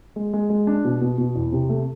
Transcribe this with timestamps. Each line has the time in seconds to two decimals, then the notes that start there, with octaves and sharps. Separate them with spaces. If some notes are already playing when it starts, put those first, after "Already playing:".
0.16 G#3
0.33 G#3
0.50 G#3
0.67 D4
0.84 B2
1.01 B2
1.18 B2
1.35 E2
1.52 C3
1.69 A3